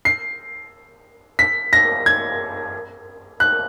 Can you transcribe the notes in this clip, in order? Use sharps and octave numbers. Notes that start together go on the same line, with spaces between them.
C7
B6
A#6
G#6
F#6